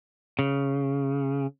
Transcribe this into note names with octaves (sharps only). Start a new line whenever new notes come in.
C#3